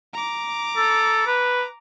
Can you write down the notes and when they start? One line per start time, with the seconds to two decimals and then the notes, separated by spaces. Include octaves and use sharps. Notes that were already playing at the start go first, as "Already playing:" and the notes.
0.13 A#5 D6
0.77 A4
1.26 B4